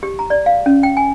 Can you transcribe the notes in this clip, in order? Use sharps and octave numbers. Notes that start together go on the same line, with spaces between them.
G4
A#5
D5
F5
C#4
G5
G#5